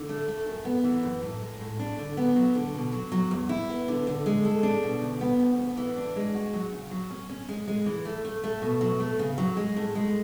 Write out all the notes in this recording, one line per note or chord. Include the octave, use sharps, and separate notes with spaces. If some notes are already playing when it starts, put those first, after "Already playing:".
Already playing: D3
A3
A3
F#2
B3
E3
F#2
A2
G#3
A2
D4
D3
B3
F#3
D3
B2
F#3
F#3
E2
E4
B3
D3
D3
G#3
A4
D4
B2
D2
B3
D2
B3
E3
D4
G#3
F#4
F#3
C#3
F#3
C#4
C#4
G#3
G#3
E3
A3
A3
A3
B2
F#3
A3
C#3
F#3
G#3
A2
G#3